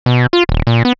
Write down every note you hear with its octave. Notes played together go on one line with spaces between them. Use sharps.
B2
F4
D#1
A#2
B3